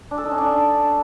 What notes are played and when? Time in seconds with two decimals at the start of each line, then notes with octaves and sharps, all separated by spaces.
0.11 D4
0.18 A4
0.25 D#4
0.31 C#4
0.38 D4